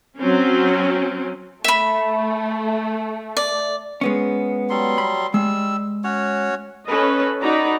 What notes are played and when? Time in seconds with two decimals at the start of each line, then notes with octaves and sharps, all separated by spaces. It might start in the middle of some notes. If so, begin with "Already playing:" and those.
0.18 F#3 C4 C#4
1.64 A3 E5 B5
3.37 D5
4.01 G#3 B3 C#4
4.70 F#3 G3 C6
4.98 B5
5.34 G3 G#3 E6
6.04 C#4 F#4 C#5
6.86 C#4 A4 B4 D#5
7.42 D#4 F#4 D5 A#5 B5